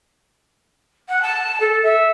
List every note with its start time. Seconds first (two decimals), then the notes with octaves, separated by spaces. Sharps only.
1.09 F#5
1.22 A5
1.60 A4
1.83 E5